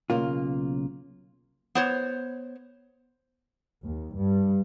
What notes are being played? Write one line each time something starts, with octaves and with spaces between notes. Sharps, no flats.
B1 C#3 A#3 F4
B3 C5 C#5
D#2
G2